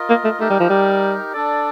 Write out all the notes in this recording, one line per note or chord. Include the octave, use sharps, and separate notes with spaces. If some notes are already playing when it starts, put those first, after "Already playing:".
Already playing: F4 A#4 D#5
A#3
A3
A3 D#4 G4 A#4
G3
F3
G3
D4 A4 D5